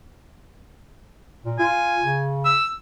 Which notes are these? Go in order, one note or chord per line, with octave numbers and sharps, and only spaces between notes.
A#2
F4 G#5
C#3
E6